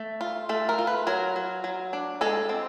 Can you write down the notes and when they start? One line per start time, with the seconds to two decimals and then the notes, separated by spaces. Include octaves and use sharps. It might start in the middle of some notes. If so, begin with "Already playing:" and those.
Already playing: A3
0.21 F4
0.49 A3 A4
0.69 A#4
0.79 F4
0.87 B4
1.07 F#3 A#4
1.36 F#3
1.64 F#3
1.93 D4
2.21 G#3 A4
2.49 C4